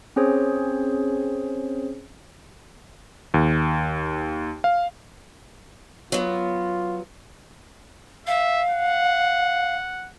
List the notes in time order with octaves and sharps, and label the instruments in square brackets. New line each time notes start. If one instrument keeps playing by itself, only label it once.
[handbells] C4 C#4 G#4 C5 C#5
[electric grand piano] D#2
F5
[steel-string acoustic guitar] F#3 B3 [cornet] F4
[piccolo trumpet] E5 [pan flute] F5
[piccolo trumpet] F#5